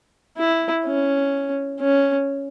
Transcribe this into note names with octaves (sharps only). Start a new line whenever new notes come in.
E4
C#4
C#4